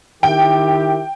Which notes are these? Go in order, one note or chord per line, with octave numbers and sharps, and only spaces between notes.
D#3 E4 G4 G5